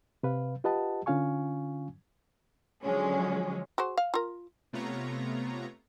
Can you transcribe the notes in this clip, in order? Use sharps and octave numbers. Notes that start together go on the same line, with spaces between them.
C3 B4 F5
F4 G4 B4 D#5 F#5 A5
D3 C#4 F4 F5 G#5 C#6
D3 F3 F#3 G#3 C#4
F#4 G#4 C5
F5
F4 A#4
C3 A3 B3 F4 C#5 A#5